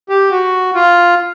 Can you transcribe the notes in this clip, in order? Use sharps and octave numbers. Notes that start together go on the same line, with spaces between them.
G4
F#4
F4